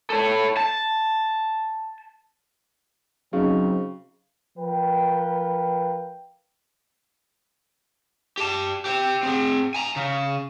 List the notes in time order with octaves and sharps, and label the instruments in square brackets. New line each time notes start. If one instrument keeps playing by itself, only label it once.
[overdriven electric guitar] A4 C#5
A5
[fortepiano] C#3 [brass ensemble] F#3 C4 D#4
[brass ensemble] F3 A#4 B4 F5 G5
[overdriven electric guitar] G4 A5
G4 C5
C4 G#4
G#5 A#5
C#3